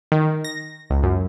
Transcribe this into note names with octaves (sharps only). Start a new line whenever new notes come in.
D#3
A#6
C#2
F#2